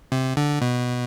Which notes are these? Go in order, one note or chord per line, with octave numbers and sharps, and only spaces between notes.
C3
D3
B2